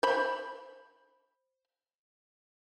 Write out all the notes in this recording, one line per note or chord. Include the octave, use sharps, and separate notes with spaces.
C5 B5